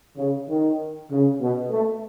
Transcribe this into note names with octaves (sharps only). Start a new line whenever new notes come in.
C#3
D#3
C#3
B2
A3